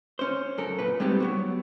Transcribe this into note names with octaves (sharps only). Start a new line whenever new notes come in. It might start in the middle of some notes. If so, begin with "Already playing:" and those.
C#4 C5
F#2 A4 A#4
A#2 B4
G3 G#3 B3 C4 D#4 G4
F#3 B3 F#4